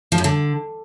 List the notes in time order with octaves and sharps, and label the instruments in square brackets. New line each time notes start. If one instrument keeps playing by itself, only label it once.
[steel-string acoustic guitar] F3
F#2
D3